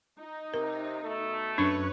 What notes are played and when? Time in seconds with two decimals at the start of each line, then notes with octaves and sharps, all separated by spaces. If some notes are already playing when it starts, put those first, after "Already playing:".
0.19 D#4
0.54 C3 A#4
1.04 B2 A3
1.58 F#2 D4 B4 C#5 C#6 G#6